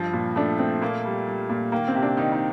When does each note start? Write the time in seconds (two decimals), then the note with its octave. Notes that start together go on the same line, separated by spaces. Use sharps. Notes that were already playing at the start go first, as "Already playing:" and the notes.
Already playing: G2 F3
0.13 A#2
0.36 A3 D4
0.59 A3 C4
0.81 A#2 A#3
1.05 G3
1.27 G3
1.49 A#2
1.72 D#3 A#3
1.88 C4
1.95 C3
2.02 D4
2.17 D#3 D#4
2.32 D#4